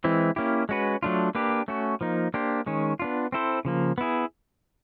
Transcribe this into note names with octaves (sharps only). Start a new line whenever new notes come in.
E3 G#3 C4 E4
A#3 C#4 E4 G4
G#3 C#4 F#4 B4
F#3 A3 D4 F4
A#3 D4 G4 B4
A3 C#4 F#4
F3 A#3 D#4
A#3 D4 G4 C5
D#3 G#3 C#4
B3 D4 F4
C4 E4 A4 C5
C#3 F3 A#3
B3 E4 G#4